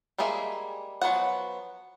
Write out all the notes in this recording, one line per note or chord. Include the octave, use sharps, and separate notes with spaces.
G3 G#3 A#3 G#4 E5
F3 F#3 B3 F#4 F#5